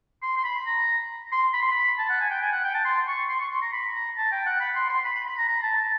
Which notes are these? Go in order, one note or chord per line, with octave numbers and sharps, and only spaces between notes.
C6
C6
B5
A#5
C6
B5
C6
B5
A5
F#5
G#5
G5
G#5
F#5
G5
A5
C6
C#6
C6
C#6
C6
A#5
B5
A#5
A5
G5
F#5
B5
C6
C6
B5
B5
B5
A#5
A#5
A5
A5